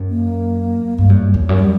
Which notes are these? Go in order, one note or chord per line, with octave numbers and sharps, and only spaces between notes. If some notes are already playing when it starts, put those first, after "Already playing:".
Already playing: F#2
A#3
G2 A#3
F#2 G3
E2 F#3
F#2
G3